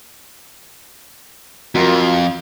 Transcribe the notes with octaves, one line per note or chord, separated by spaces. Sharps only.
F2 F#3 F4 A#4